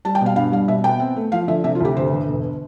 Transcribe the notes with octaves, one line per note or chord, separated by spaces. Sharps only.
G3 A5
G5
B2 F5
G2 F5
G3 F5
B2 E5
B3 G5
C4
A3
F3 F5
D3 E5
C3 E5
F4
D2 G4
G1 C5
G1
E1